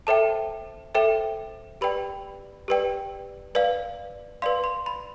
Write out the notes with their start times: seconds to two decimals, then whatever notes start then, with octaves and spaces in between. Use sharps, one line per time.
0.07 A4 C5 E5 G5 A5
0.95 A4 C5 E5 G5
1.81 G4 B4 D5 G5 B5
2.68 G4 B4 D5 G5
3.55 B4 D5 F5
4.42 B4 D5 F5 C6
4.64 C6
4.86 B5